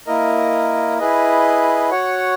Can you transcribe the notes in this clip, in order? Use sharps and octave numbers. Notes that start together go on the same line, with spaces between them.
A#3 E4 A#4 D#5
E4 G#4 B4 D#5
F#4 C#5 F#5